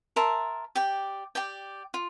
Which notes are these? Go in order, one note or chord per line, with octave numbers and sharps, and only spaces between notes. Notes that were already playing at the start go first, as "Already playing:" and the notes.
A#4 E5 A5 C6
G4 D5 G5
G4 D5 G5
F4